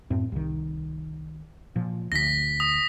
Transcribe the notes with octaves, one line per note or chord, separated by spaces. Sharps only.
F#2 A2 C4
C2 D#3
A#2 F3
D2 A#6 B6
D#6